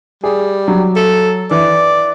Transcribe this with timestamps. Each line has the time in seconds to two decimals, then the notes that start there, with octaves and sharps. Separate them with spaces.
0.24 G3 G#4
0.68 F#3
0.96 A4
1.51 E3 D5